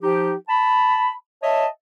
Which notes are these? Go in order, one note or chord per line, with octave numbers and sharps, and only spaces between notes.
F3 D#4 G4
A5 B5
C#5 D#5 E5 A5